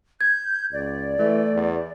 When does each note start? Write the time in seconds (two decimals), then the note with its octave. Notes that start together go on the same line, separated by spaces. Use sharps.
0.21 G6 G#6
0.72 C#2 D5
1.18 E3 A3
1.54 E2